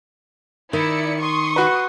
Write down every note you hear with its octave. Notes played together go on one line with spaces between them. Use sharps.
D#3 E4 D5 C#7
C6 C#6 D#6
F#4 B4